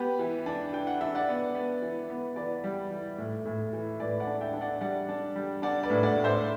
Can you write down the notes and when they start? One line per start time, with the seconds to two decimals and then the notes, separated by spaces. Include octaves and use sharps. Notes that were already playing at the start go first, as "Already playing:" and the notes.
Already playing: B3 G4 B4
0.19 E3
0.46 D4
0.73 E3 G5
0.87 F#5
1.01 D4 E5
1.15 D5 F#5
1.28 B3
1.55 B3
1.82 E3
2.10 B3
2.36 E3 B4 D5
2.64 G3
2.91 E3
3.18 A2
3.45 A2
3.73 E3
4.00 A2 B4 D5
4.20 D5 F#5
4.27 D4
4.41 E5 G5
4.54 D4
4.61 D5 F#5
4.81 G3 D5 F#5
5.09 D4
5.36 G3
5.62 D4 D5 F#5
5.83 B4 D5
5.90 A2
6.03 D5 F#5
6.17 A2
6.24 C5 E5
6.35 E5